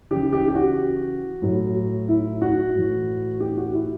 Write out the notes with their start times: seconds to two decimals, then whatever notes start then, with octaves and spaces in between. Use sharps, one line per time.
0.11 C#3 E3 G4
0.33 G4
0.48 G4
0.55 F#4
1.42 A2 F#3
2.08 E4
2.41 F#4
2.75 A2 E3
3.40 G4
3.57 F#4
3.73 E4